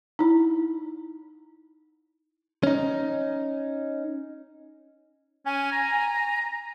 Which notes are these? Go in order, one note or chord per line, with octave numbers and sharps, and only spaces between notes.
D#4 E4
C#4 D#4
C#4 G#5
A#5